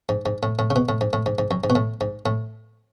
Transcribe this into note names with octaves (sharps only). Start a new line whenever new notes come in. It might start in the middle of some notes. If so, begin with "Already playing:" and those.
G#2
G#2
A2
A2
C#3
B2
A2
G#2
A2
G#2
G#2
F#2
G#2
B2
A2
G#2
A2